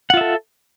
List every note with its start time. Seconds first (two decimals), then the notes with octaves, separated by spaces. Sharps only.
0.10 F#5
0.14 F4
0.17 E5
0.21 A4